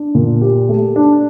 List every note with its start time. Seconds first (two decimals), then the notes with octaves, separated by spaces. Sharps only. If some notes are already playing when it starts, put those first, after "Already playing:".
Already playing: D4
0.15 A#2
0.42 G4
0.69 A3
0.96 D4